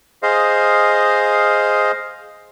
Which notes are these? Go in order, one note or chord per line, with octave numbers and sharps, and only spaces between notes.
G#4 C5 D#5 F5